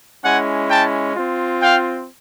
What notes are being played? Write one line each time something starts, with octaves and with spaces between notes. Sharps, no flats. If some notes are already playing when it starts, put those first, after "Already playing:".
G#3 C#4 E4 F#5 G#5
G5 A5
C4 F4
F5 G5